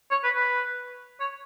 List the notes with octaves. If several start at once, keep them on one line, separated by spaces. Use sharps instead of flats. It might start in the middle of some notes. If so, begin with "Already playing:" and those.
C#5
B4
B4
C#5